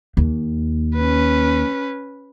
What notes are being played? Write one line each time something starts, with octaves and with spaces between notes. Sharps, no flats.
D#2
C#4 B4